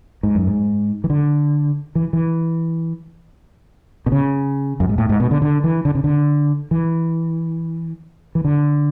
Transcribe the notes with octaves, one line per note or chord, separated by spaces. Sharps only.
G#2
F#2
G#2
E3
D3
E3
E3
B2
C#3
F#2
G#2
A2
G#2
B2
D3
D3
E3
D3
C#3
D3
E3
E3
D3